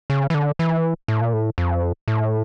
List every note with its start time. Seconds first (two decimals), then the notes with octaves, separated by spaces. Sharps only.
0.10 C#3
0.30 E3
0.34 D3
0.59 E3
1.08 A2
1.21 A#2
1.33 A2
1.58 F2
2.08 A2